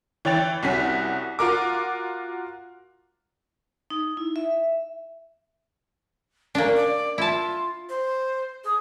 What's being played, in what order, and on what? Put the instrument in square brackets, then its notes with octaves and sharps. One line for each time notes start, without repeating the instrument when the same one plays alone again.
[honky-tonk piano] E3 C#5 G5 A6 F7
C2 C#4 F#4 B6
F4 F#4 A#4 D6
[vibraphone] D#4
E4
E5
[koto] A#3 D4 [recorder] C#4
[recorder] D5
[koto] E4 A5 [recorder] F4
[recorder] C5
G#4